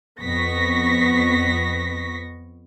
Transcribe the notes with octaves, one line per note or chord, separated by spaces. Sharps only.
F2 B3 C#6 A#6 B6